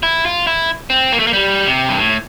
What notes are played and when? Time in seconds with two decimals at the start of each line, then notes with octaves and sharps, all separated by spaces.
0.03 E4
0.26 F4
0.47 E4
0.90 C4
1.12 A#3
1.19 A3
1.27 A#3
1.33 G3
1.67 C3
1.89 G2
1.99 A2